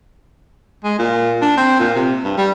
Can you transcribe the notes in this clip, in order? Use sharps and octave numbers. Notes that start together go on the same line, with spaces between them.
G#3
A#2
D4
C4
A#2
C3
G2
G3